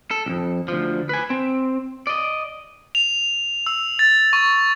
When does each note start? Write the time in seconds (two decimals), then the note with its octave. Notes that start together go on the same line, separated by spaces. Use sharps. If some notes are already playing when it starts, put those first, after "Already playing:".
0.11 A4
0.26 C2 F2
0.68 D2 F3
1.09 B4 G#5
1.30 C4
2.07 D5 D#5
2.95 F7
3.67 E6
3.99 A6
4.33 C#6